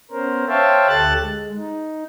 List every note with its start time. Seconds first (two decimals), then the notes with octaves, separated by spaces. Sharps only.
0.11 B3 C#4 A#4 C5
0.48 C5 C#5 E5 F5 G5 A5
0.88 D2 G4 A4 A5 F#6 A6
1.20 G#3
1.56 D#4